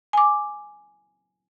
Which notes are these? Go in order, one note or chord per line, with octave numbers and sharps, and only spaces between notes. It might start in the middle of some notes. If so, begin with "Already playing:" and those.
G#5 D6